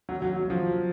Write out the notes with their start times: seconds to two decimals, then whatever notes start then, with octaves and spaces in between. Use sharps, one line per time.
0.09 F#3
0.22 F#3
0.36 F#3
0.50 F3